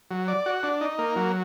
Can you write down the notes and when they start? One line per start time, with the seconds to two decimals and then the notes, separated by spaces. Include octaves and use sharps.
0.11 F#3
0.28 D5
0.46 F#4
0.63 D4
0.81 D#4
0.98 A#3
1.16 F#3